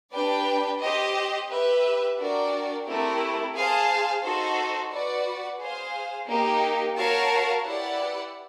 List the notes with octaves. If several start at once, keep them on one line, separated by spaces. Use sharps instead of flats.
D4 G4 B4 D5 G5
G4 C5 D#5
G4 B4 E5
D4 F#4 A#4 D5 G5
A3 C4 E4 G4 A#4
G#4 C5 F5 A5
D#4 F#4 A4 C5
F#4 B4 D5 F#5
G#4 C5 F5
A#3 D#4 G4
F#4 A#4 C#5 F5 A5
E4 G4 B4 D5 F#5